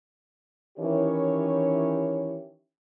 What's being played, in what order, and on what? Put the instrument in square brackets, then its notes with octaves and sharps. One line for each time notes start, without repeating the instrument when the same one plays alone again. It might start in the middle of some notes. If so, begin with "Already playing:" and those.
[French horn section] D#3 E3 C#4 E4 G4 C#5